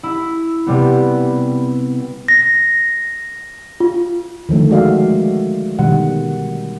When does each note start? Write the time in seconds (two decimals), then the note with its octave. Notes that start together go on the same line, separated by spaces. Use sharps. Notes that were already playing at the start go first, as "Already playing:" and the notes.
0.03 E4
0.66 C3 G3 B3
2.28 A#6
3.80 F4
4.49 D3 D#3 F3 A3
4.71 G#3 F#4 G#4 D5 E5 F5
5.79 B2 D3 D#3 G3 F#5